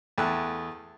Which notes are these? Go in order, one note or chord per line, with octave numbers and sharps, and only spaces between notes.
E2 A3 G5 E6 F#6